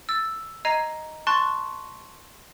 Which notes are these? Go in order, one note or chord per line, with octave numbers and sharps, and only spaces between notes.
E6 A6
D#5 A#5 G#6 C7 D#7
A5 C6 C#6 F#6 A6